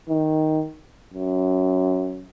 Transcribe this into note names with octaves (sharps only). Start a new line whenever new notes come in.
D#3
F#2